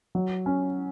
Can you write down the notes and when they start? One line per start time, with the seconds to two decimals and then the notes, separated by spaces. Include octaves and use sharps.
0.15 F#3
0.46 C#4